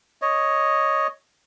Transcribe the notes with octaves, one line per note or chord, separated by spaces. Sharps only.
C#5 D#5